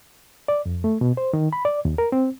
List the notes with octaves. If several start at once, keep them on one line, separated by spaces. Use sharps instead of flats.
D5
F2
A3
B2
C5
D#3
B5
D5
D#2
A#4
C4